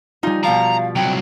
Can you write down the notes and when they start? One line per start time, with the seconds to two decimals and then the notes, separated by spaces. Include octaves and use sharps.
0.23 G3 D#4 F4 G#5
0.44 B2 F3 F5 A#5
0.96 C2 F#3 G5